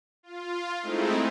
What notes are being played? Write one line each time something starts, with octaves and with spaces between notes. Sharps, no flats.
F4
G#3 A3 C4 D#4 E4